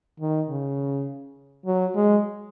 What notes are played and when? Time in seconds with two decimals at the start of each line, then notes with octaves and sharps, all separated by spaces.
0.20 D#3
0.49 C#3
1.66 F#3
1.95 G#3